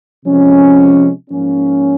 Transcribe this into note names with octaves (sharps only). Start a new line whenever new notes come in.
C3 F3 G#3 C#4
G#2 F3 A#3 C#4